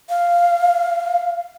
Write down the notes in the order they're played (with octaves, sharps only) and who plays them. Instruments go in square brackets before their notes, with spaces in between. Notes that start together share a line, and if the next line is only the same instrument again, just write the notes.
[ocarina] F5